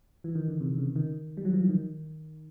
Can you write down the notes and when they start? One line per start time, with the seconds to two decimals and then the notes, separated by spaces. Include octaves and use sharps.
0.24 E3
0.35 D#3
0.48 D3
0.60 C3
0.78 C#3
0.96 D#3
1.37 G3
1.45 F#3
1.54 F3
1.61 E3
1.69 D#3